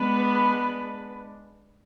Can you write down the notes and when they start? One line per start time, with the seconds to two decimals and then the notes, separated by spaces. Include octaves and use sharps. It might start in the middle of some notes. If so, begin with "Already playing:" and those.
Already playing: G#3 B3 D4 B4